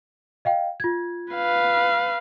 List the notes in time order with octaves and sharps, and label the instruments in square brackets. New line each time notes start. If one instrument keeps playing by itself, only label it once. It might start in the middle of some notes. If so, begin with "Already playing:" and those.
[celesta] D#5 F5 G5
F4 G#6
[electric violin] B4 F5